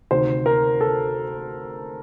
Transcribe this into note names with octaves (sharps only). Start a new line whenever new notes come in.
D2 C3 D#3 C5
A#4
A4